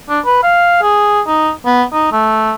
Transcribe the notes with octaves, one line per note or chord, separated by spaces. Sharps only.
D4
B4
F5
G#4
D#4
B3
D#4
A3